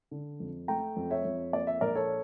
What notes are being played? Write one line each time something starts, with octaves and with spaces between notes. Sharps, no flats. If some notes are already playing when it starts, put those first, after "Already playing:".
D3
F2
A3 G5 A#5
F2
C#5 E5
F2
A#3 D5
E5
A#1 A#4 D5
A4 C#5